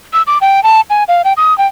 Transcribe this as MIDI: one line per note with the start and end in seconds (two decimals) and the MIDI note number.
0.13 0.22 88
0.27 0.38 86
0.41 0.63 79
0.63 0.81 81
0.90 1.04 80
1.08 1.22 77
1.24 1.33 79
1.37 1.56 87
1.58 1.67 79